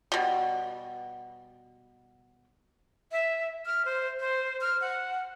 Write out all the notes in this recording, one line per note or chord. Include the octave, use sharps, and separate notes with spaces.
B2 G3
E5
F6
C5
C5
F6
F#5